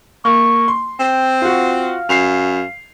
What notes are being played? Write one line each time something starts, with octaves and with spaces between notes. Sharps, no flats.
A#3 C#6
C6
C4 G5
F4 F#4
F5
F#2 C7 F7